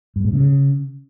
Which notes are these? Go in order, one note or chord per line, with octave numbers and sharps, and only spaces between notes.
G2
A2
C#3